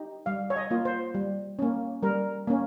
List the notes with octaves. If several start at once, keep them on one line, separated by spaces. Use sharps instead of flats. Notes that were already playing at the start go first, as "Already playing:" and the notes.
Already playing: D#4 G4
G3 F5
C#5
D#5
A#3 F4
C5
G3
A#3 C#4
G3 A#4
A#3 C#4